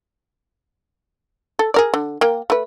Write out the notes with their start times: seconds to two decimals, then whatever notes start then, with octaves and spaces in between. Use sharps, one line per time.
1.59 A4
1.74 G#4 A#4 D5
1.94 D3
2.21 A#3 G5
2.50 A3 B4